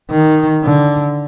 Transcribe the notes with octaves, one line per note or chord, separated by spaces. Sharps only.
D#3
D3